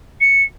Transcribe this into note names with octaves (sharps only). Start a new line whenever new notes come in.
C#7